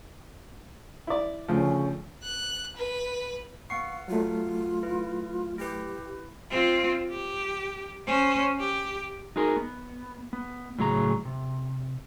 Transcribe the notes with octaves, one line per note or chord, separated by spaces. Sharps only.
E4 D5
D2 C#3 F3
F#6
B4
B3 F5 F#5 C#6 C7
F#3 A3 F4
E4 B4
E4 G4 B4
C4 F4
G4
C#4 C5
G4
D#4 F#4 G#4 A#4
B3
B3
A2 C#3 F#3 G#4 G#5 A#5
C3